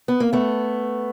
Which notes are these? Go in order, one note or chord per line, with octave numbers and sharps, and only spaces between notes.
B3
A#3
A3 B3